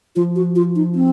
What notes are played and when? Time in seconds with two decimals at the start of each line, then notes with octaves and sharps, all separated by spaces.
0.16 F3 F4
0.36 F#4
0.56 F4
0.76 D#4
0.95 C4